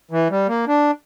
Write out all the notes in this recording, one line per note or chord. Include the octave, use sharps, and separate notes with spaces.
E3
G3
A#3
D4